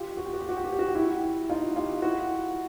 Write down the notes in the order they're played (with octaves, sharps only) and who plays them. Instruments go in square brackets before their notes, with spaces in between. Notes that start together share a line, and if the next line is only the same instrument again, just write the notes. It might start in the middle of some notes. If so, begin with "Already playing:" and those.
Already playing: [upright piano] F4 G4
F#4
G4
F#4
G4
F#4
G4
F#4
G4
F#4
G4
E4 F#4
D#4 F4
F4 G4
E4 F#4